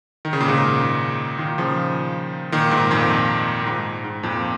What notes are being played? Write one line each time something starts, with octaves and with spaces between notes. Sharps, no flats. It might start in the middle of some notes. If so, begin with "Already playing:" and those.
D#3
C#3
A#2
G#2 C#3
A#2 D#3
C#3 F3
A#2 D#3
G#2
F2 A#2
A#2
G#2
G#2
F2 A#2